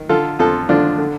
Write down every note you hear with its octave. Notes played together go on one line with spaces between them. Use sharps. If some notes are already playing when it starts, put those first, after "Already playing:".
Already playing: D#3
D3 F4 A4
F2 F4 A4
D3 D4 F4
D3